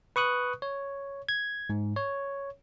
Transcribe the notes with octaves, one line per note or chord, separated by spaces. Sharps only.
B4 C#6 D#6 F#6
C#5
G#6
G#2
C#5